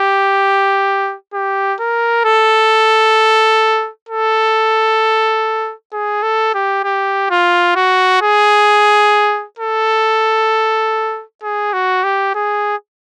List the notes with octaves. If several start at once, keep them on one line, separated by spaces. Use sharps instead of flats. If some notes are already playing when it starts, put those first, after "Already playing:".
Already playing: G4
G4
A#4
A4
A4
G#4
A4
G4
G4
F4
F#4
G#4
A4
G#4
F#4
G4
G#4